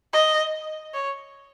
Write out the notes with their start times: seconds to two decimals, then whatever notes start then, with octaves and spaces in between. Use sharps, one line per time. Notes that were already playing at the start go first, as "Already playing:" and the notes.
0.13 D#5
0.94 C#5